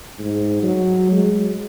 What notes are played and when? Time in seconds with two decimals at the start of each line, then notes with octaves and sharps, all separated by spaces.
0.19 G#2
0.63 F#3
1.12 G#3